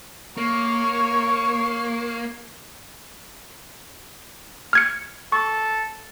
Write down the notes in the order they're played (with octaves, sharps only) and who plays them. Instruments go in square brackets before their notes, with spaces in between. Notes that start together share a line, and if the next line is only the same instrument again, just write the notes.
[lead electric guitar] A#3 [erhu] C#5
[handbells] F6 G#6 C#7
[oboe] A4 [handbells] C#6